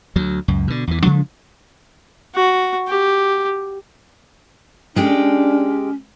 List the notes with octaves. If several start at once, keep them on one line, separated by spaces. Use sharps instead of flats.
D2 F#3
C#2 F#2
B2 D3
E2 E3
C#3 F3 G#3 D4
F#4
G4
G#3 C#4 D4 G4